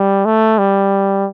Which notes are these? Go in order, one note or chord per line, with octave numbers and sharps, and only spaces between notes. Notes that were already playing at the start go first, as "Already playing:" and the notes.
Already playing: G3
A3
G3